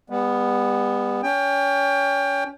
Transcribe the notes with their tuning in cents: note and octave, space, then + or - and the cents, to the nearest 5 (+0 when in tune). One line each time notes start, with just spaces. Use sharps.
G3 +40 B3 +0
C#4 +30 G5 +25